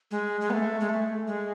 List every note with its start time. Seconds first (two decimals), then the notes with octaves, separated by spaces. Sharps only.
0.11 G#3
0.41 G#3
0.50 B3
0.53 A3
0.81 G#3
0.89 A3
1.28 G#3